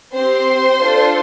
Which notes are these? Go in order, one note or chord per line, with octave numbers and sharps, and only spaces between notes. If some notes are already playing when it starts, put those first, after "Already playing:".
C4 G4 C5 C6
D4 F4 A4